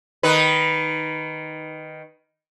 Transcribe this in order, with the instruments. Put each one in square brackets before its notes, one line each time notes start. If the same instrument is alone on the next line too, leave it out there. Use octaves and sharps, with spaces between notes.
[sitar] D#3 D#4 B4